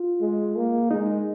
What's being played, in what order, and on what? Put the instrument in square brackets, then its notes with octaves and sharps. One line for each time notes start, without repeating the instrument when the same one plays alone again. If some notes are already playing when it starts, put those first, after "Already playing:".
Already playing: [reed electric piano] F4
[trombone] G#3
A#3
[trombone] G#3 [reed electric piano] D#4